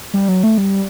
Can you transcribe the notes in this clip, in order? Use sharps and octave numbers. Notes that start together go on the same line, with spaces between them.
G3
F#3
A3
G3